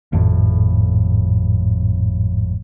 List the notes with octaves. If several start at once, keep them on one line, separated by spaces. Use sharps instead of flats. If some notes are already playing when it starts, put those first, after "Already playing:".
G#1 F2 A2